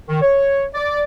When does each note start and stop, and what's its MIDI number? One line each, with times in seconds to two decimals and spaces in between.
0.09 0.22 51
0.22 0.64 73
0.74 1.03 74